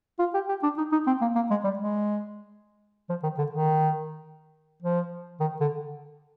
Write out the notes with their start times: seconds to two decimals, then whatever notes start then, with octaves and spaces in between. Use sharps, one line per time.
0.19 F4
0.34 G4
0.49 G4
0.63 D4
0.78 D#4
0.92 D#4
1.07 C4
1.21 A#3
1.35 A#3
1.50 G#3
1.64 G3
1.79 G#3
3.09 F3
3.23 D#3
3.38 D3
3.52 D#3
4.83 F3
5.40 D#3
5.61 D3